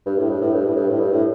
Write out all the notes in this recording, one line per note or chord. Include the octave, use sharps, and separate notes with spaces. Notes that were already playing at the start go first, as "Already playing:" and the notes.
G2
A2
G2
A2
G2
A2
G2
A2
G2
A2